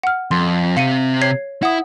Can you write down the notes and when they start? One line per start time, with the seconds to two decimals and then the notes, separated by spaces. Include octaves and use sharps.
0.03 F#5 F6
0.31 F2 C6
0.77 C3 C4 F5 C#7 D#7
1.21 C#5 G#6 C7
1.63 E4 F#5 D#6